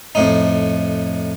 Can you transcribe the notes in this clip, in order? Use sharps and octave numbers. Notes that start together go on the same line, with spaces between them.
F2 A2 D#4